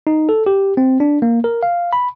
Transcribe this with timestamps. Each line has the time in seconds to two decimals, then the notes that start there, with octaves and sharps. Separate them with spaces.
0.07 D#4
0.29 A4
0.46 G4
0.77 C4
1.00 D4
1.22 A#3
1.44 A#4
1.63 F5
1.93 B5